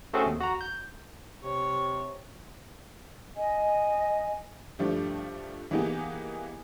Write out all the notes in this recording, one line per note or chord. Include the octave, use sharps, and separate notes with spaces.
A3 C4 C#4 F#4 G#4 A4
D#2
F#4 A#5
G6
C3 C#5
D#5 G#5
G2 F3 G3 A3 D4 G4
E3 A#3 B3 D#4 G4 G#4